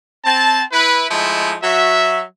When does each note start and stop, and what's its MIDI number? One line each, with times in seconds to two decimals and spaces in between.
0.25 0.62 60
0.25 0.62 81
0.72 1.06 64
0.72 1.06 71
1.10 1.55 53
1.10 1.55 56
1.10 1.55 57
1.10 1.55 63
1.10 1.55 64
1.63 2.23 54
1.63 2.23 66
1.63 2.23 76